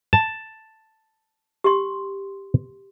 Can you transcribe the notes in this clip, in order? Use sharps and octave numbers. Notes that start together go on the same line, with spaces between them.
A5
G4 C6